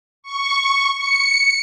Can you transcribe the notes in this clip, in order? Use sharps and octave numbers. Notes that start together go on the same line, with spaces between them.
C#6
C#7